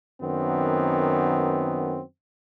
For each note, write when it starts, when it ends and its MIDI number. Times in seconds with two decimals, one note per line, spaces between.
0.21 2.00 42
0.21 2.00 51
0.21 2.00 59
0.21 2.00 60